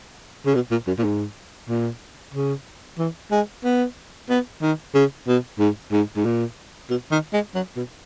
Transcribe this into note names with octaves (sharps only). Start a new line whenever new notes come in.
C#3
B2
A#2
F#2
A#2
G#2
A#2
C#3
E3
G#3
B3
B3
D#3
C#3
B2
G#2
G#2
G#2
A#2
B2
D#3
G#3
F#3
B2